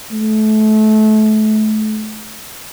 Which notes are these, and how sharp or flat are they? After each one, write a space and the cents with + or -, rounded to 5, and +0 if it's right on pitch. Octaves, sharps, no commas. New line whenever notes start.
A3 -30